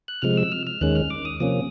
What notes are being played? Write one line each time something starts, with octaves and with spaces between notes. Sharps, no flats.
F#6
C3 F3 G#3 F6
E6
F6
F6
D#2 D#3 G#3 C#4 F#6
F6
D6
D#6
C3 F3 A#3 C#4 D#6